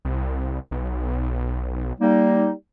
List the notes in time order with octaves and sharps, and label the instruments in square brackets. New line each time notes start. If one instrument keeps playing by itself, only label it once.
[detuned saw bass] C2
B1
[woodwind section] G3 A#3 D#4